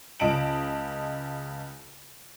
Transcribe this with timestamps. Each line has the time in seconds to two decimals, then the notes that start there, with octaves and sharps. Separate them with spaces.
0.20 C#2 D#5 A5 D7 F#7